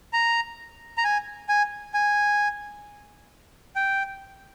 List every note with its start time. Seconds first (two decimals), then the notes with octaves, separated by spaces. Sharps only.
0.13 A#5
0.98 A#5
1.04 G#5
1.49 G#5
1.94 G#5
3.76 G5